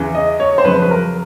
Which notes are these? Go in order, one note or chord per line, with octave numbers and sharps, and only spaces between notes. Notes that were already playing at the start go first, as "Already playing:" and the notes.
Already playing: E2 C#3 E3
D#5
C#5
C5
F2 C#3 F#3 B4
B4
A#4